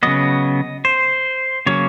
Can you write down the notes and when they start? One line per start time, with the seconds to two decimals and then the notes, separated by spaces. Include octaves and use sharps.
0.03 C#3 F#3 B3 D#5
0.85 C5
1.66 C#3 F#3 A#3 C#4 C#5